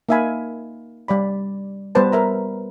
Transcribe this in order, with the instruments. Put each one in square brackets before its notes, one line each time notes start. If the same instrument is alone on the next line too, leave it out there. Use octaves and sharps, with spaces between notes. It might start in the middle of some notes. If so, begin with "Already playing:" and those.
[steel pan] A#3 D#4 E5 F5 G#5 B5
G3 D5 B5
G3 B3 B4 C5 A5
A#4 E5 A#5